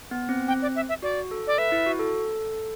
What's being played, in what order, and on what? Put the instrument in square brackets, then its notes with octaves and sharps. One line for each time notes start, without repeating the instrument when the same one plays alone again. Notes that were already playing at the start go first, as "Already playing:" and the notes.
[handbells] B3
C4
[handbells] C4 [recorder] G5
[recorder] D5
E5
E5
[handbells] F#4 [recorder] D5
[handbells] A4
[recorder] D5
[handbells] B4 [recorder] E5
[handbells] E4
F#4
A4